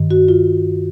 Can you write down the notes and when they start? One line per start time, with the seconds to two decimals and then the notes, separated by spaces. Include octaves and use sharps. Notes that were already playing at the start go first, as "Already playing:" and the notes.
Already playing: G2 D#3
0.11 F#4
0.28 F4